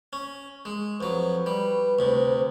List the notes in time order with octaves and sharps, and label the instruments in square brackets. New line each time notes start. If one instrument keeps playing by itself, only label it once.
[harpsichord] C#4
G#3
[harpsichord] F2 F#3 [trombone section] B4
[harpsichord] G3
D2 C3